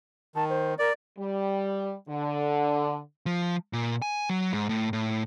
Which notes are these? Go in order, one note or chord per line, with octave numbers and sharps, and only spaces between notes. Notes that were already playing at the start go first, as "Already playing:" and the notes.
D#3 A5
C5
A#4 D5
G3
D3
F3
A#2
G#5
F#3
G#2
A2
A2